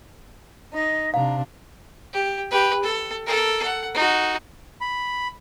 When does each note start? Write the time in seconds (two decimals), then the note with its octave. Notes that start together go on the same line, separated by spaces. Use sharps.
0.73 D#4 D#5
1.14 C3 D4 F5 A#5
2.13 G4
2.51 G4 B4
2.83 A4
3.26 A4 A#4
3.64 F#5
3.94 D#4 F#4
4.81 B5